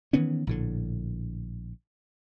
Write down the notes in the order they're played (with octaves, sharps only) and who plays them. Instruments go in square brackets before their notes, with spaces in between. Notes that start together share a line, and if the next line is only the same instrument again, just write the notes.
[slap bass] D#3 E3 B3 C#4
A#1 A2 D3